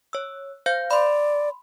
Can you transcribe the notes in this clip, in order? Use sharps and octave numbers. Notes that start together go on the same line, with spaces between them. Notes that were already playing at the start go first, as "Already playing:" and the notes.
C#5 E6
C5 F5 G6
D5 B5 C6